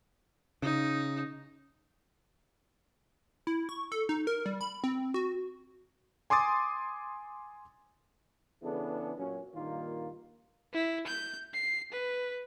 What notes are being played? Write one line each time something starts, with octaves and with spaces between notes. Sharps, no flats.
C#3 D#4
E4
C#6
A4
D#4
A#4
G3
B5
C4
F#4
G#5 C6 D6 D#6 A6
C#3 E3 B3 D4 G#4 A4
F#2 A#2 F#3 C#4
G2 A#2 D#3 A#3 D#4 F4
E4
G6
C7
B4